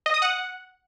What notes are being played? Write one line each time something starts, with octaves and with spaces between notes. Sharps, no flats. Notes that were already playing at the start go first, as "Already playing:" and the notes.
D#5
D#6
F#5